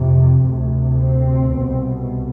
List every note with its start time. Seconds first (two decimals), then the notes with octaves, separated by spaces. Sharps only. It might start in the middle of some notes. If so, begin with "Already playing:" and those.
Already playing: F2 C3
0.43 D2 C3
0.96 C4
1.50 C2 B2